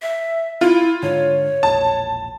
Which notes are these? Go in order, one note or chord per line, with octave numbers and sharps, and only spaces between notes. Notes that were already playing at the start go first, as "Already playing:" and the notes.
E5
E4 F4
G#2 D3 C#5
E1 A#1 A5